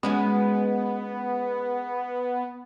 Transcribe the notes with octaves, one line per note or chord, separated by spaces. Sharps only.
G#3 B3 C#4 F#4